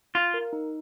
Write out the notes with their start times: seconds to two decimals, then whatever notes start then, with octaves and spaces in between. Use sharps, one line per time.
0.15 F4 F5
0.34 A#4
0.53 D#4